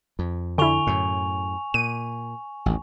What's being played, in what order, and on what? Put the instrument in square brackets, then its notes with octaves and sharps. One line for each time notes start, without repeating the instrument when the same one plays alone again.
[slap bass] F2
[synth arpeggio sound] D3 E4 [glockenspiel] G#5 C#6 F7
[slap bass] F#2 A2
[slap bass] A#2 [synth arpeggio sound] D#7
[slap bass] A1 D#2